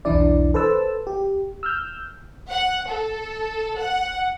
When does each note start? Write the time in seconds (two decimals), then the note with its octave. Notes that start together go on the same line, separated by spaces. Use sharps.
0.05 B1 E2 E3 D4 E4 D5
0.54 A4 B4 C5 A5 E6
1.07 G4
1.63 E6 F6 G6
2.50 F#5
2.89 A4
3.79 F#5